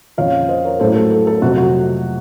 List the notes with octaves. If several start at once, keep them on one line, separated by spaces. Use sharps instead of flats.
F2 C#3 F3 C#5 F5
C5 D#5
A#4 C#5
A1 A2 F#3 A4 C5
A4
A4
A4
F2 C3 F#3 F#4
F#4